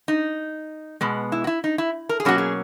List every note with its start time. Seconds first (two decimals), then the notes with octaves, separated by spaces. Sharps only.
0.08 D#4
1.01 B2 G#3 B3
1.32 E4
1.44 F#4
1.47 E4
1.64 D#4
1.78 E4
2.09 A#4
2.20 G#4
2.25 B2 F#3 A#3 C#4 F#4
2.38 G#4